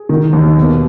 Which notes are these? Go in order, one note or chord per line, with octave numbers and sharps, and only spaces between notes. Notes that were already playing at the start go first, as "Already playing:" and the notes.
Already playing: G#4
D#3
D#2
B2